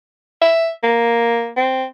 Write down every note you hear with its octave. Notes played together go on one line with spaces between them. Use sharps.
E5
A#3
C4